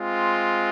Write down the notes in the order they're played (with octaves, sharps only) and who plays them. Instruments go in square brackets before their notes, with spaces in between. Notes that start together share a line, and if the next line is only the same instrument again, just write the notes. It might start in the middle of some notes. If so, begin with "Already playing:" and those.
Already playing: [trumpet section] G#3 C4 F4